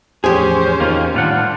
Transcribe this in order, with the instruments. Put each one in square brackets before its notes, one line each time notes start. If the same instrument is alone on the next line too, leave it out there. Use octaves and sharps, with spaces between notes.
[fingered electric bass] E2 A2 F3 [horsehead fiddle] C#4 C5 [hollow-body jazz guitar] G4 G#4
[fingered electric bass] E2 B3 [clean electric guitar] D#3 A#3 F4
[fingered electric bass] A2 D#3 [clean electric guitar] G3 F4 F#5 [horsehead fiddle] D4